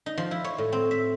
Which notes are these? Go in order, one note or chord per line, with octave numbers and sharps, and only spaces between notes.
D#4
F3
E4
C#5
A2
C4
E5